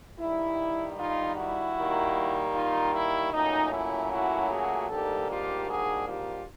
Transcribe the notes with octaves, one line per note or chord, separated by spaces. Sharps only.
G2 D#3 G3 E4
D#4 F4
E4 F#4
D#3 G3 A#3
D#4 F4
E4
A#2 F#3 A3 C#4 D#4
E4
E4 F#4
F#4 G#4
G#2 D#3 G3 A#3 D4 G4 A4
F4 G4
F#4 G#4
F4 G4